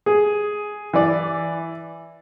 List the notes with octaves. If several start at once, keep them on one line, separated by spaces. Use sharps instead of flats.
G#4
E3 D5